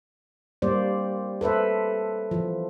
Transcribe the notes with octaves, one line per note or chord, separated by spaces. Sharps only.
G3 A#3 C5 D5
A4 B4 C5 E5
E3 F3